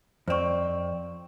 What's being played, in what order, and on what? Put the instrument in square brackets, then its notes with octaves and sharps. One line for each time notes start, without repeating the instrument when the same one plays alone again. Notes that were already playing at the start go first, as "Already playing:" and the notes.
[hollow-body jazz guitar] F2 C4 [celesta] C5 D5 C#6